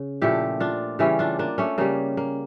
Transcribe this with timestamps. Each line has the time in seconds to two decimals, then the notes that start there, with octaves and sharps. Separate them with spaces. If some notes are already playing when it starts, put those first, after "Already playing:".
Already playing: C#3
0.22 A#2 F3 A3 E4 G4
0.60 D4 F4
0.99 C#3 E3 G3 C#4 E4
1.19 D4 F4
1.39 A#3 D4
1.58 A3 C#4
1.78 C#3 G3 A#3
2.17 A#3